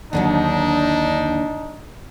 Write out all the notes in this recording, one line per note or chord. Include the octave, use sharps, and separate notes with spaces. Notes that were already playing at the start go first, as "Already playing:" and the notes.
D#2 D3 F#3 D4 D#4